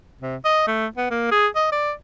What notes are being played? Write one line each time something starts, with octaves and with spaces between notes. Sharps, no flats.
C3
D#5
A3
B3
A#3
G#4
D#5
D5